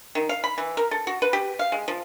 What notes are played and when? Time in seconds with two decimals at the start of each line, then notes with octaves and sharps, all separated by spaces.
0.15 D#3
0.29 F5
0.44 B5
0.58 E3
0.77 A#4
0.91 A4
1.07 F#4
1.22 B4
1.33 G4
1.59 F5
1.72 G#3
1.88 F3